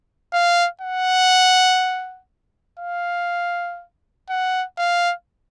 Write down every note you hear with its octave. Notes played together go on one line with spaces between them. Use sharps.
F5
F#5
F5
F#5
F5